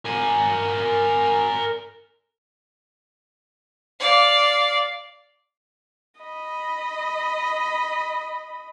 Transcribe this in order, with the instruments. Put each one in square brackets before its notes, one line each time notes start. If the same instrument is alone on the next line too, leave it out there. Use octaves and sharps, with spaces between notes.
[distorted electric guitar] A#4 G#5
[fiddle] D5 F5
[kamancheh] D#5 B5